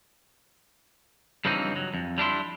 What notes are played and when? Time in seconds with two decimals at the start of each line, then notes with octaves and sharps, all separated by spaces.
1.45 G2 C#3 E3 F3 C4 D#4
1.76 F#3
1.94 F2
2.18 G3 D4 E4 C6